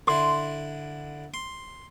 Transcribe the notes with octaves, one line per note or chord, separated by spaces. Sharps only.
D3 E4 C6
C6